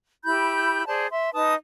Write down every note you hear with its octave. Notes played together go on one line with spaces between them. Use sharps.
E4 G4 B5 G6
G#4 C5 D5 A5
E5 C6
D#4 B4 A5 D#6